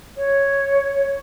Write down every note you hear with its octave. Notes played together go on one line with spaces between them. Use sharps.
C#5